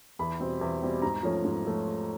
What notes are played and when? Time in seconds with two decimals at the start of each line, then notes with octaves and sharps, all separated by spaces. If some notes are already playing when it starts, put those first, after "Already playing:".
0.19 E2 B5
0.40 B2 G3 C4
0.61 E2
0.82 B2 G3 C4
1.02 G#2 A#5
1.23 F3 A3 C#4
1.44 G#2
1.65 F3 A3